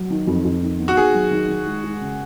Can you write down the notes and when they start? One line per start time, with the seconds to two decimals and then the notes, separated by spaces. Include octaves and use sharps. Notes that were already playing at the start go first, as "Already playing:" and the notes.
Already playing: F#3
0.10 D#3
0.27 F2
0.44 F2
0.63 D#3
0.79 B3
0.88 F#4
0.97 D#3 G#4
1.14 F#3
1.31 D#3
1.48 D#3
1.66 G#3
1.84 G#3
2.01 C#3